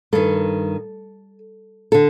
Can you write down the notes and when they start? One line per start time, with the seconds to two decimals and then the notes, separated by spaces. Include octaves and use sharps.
0.13 G2 D#3 A4
1.92 D3 A4